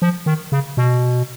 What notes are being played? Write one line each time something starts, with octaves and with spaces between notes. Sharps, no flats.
F3
D#3
C#3
B2